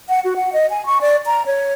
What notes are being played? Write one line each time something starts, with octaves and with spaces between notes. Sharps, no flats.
F#5
F#4
F#5
D#5
G#5
C#6
D5
A#5
C#5